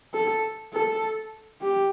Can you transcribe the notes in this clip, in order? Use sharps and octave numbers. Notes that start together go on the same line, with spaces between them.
A4
A4
G4